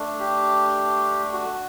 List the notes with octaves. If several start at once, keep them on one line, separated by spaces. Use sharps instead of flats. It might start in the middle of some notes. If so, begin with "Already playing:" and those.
Already playing: A3 D4
G4
F#4